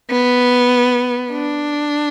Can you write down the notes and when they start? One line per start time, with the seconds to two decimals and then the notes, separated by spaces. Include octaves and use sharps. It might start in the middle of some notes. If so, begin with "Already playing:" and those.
0.10 B3
1.32 D4